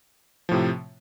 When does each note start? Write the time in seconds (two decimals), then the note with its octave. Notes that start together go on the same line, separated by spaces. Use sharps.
0.49 F3
0.51 A2
0.54 C3